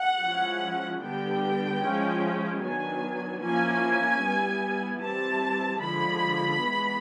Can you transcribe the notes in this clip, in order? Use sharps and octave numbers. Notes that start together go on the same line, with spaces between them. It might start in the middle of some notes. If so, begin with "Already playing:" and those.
Already playing: F#5
F3 G#3 C#4 E4
D3 G3 B3 D4 G5
F3 G#3 C#4 E4
D#3 F#3 B3 D4 G#5
F3 A#3 C#4 E4 G#5
G3 B3 E4
E3 G3 C4 E4 A5
D3 F3 G#3 B5
E3 G#3 B3